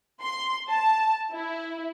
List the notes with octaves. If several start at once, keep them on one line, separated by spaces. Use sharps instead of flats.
C6
A5
E4